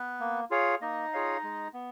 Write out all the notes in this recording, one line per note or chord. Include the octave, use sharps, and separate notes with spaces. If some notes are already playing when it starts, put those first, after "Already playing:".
Already playing: B3 B4
A#3
F4 G#4 C#5 F5
A#3 D#4 D#5
F4 G#4 C#5 F5
G#3
B3